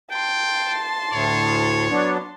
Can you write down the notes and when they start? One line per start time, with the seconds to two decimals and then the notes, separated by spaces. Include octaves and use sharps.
0.11 G5 A5 C6
1.13 D2 A2 C#5
1.90 F#3 B3 D4